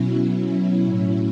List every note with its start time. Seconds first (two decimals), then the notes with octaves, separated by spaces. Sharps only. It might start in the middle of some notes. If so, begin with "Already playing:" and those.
Already playing: B2 F#3 C#4 E4
0.17 C#4 E4
0.84 A2 F#3